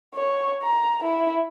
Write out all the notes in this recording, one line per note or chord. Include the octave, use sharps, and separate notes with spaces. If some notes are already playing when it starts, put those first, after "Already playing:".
C#5
A#5
E4